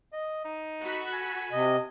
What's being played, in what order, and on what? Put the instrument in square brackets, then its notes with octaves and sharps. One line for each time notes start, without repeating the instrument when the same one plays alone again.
[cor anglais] D#5
D#4
[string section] F#4 A4 B5
[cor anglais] G#5
[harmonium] C3 D#5